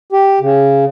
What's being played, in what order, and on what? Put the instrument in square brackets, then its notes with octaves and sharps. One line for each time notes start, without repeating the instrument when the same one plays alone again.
[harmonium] G4
C#3